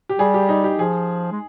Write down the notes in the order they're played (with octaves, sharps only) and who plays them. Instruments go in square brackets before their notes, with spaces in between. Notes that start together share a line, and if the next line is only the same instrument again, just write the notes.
[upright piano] G4
[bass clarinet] G3 [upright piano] G#4
[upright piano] G4
D#4
G4
[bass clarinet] F3 [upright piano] G#4
[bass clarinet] G#3